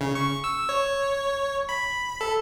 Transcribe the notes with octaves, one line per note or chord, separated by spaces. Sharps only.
C#3
C#6
E6
C#5
B5
A4